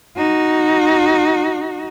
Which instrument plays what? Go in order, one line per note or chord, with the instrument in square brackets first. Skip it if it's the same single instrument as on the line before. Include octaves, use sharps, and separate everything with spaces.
[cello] D#4 F#4